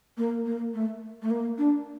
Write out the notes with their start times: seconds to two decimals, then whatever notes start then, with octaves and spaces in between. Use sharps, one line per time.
0.18 A#3
0.46 A#3
0.74 A3
1.22 A3
1.30 A#3
1.58 D4